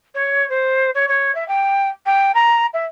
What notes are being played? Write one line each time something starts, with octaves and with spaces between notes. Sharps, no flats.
C#5
C5
C#5
C#5
E5
G5
G5
A#5
E5